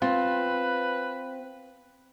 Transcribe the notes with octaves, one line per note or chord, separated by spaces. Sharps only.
C4 F4 B4